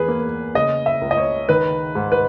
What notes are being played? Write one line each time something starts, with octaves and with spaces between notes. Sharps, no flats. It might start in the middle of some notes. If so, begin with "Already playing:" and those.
Already playing: E2 G#4 B4
A#3
C#3 D#5
E5
C#2
D#5
C#5
D#3 B4
G#2
B4